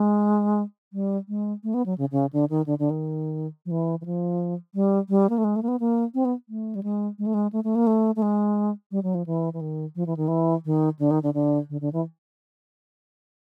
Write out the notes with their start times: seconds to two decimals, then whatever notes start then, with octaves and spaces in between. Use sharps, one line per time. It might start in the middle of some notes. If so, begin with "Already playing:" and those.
Already playing: G#3
0.93 G3
1.28 G#3
1.64 A3
1.74 B3
1.86 F#3
1.98 C#3
2.12 C#3
2.33 D3
2.50 D#3
2.66 D3
2.79 D3
2.90 D#3
3.66 F3
3.71 E3
4.01 E3
4.05 F3
4.75 G3
5.09 G3
5.30 A#3
5.38 A3
5.44 G#3
5.56 A3
5.63 A#3
5.68 B3
5.80 A#3
6.14 C4
6.25 B3
6.49 A3
6.75 G3
6.83 G#3
7.19 G#3
7.26 A3
7.34 G#3
7.53 A3
7.64 A3
7.75 A#3
7.87 A3
8.16 A3
8.22 G#3
8.91 G3
9.03 F#3
9.15 F3
9.26 E3
9.53 E3
9.61 D#3
9.96 F3
10.06 E3
10.17 D#3
10.28 E3
10.65 D#3
10.99 D3
11.11 D#3
11.23 D3
11.34 D3
11.69 D3
11.81 D3
11.93 E3